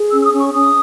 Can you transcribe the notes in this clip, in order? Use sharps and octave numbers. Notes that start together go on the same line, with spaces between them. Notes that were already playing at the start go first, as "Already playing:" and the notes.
Already playing: G#4
C#4 E6
E6
D#6
C#4
C#6
C#4 D#6